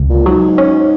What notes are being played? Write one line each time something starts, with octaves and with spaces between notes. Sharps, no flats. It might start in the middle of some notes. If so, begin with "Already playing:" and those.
Already playing: C#2
A#2
G#2 F#3
C#4